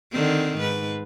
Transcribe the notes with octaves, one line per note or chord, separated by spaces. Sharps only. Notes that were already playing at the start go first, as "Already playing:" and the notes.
D3 D#3 C4
G#2 B4